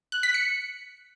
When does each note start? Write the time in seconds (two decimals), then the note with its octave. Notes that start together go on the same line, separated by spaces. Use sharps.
0.12 F#6
0.23 B6
0.34 C#7